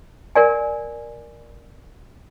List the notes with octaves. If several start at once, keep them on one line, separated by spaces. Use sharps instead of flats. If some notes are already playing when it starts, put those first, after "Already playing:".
A#4 D5 G#5